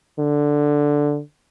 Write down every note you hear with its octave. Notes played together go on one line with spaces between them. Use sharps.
D3